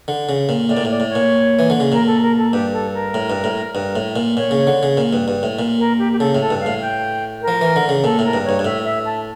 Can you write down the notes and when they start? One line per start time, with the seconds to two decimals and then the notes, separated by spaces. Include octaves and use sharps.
0.08 D3
0.29 C#3
0.49 A#2
0.69 A2 D5
0.77 A#2
0.85 A2
0.90 D5
1.00 A2
1.09 C#5
1.15 A#2
1.59 E3
1.70 D3
1.80 C#3
1.92 A#2 A#4
2.07 A4
2.22 A#4
2.37 A4
2.52 G2 G4
2.73 A4
2.94 A#4
3.14 A2
3.30 G2
3.44 A2
3.75 G2
3.96 A2
4.16 A#2
4.36 A#2 C#5
4.51 C#3
4.67 D3
4.83 C#3
4.97 A#2
5.13 G2
5.28 G2
5.43 A2
5.59 A#2
5.79 A#4
5.99 G4
6.13 G4
6.19 C#3 A4
6.35 A2
6.41 A4
6.50 G2
6.60 F5
6.66 A2
6.81 G5
7.42 A#4
7.48 F3
7.61 E3
7.76 D3
7.89 C#3
8.04 A#2 A4
8.19 A2
8.24 A#4
8.34 G2
8.45 G2 C#5
8.59 G2
8.65 A2 E5
8.85 E5
9.05 A5